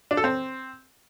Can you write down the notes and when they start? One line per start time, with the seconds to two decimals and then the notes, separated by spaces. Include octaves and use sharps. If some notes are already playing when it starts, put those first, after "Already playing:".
0.11 D4
0.17 A4
0.24 C4